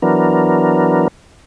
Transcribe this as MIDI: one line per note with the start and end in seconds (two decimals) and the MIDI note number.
0.02 1.08 52
0.02 1.08 54
0.02 1.08 59
0.02 1.08 62
0.02 1.08 70